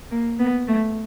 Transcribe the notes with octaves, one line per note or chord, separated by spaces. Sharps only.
A#3
B3
A3